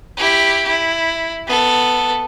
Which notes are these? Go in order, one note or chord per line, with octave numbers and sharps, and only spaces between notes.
E4 G4
E4
B3 A4